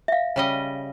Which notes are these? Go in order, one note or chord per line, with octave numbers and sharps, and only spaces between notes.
E5 F5
C#3 G3 D#5